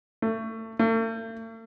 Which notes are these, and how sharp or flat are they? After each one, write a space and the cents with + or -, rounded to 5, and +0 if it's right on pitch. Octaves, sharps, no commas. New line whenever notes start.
A3 +25
A3 +45